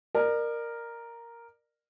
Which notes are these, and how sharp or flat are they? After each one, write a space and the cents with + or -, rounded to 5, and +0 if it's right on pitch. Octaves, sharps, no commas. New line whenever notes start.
A#4 +0 D5 +35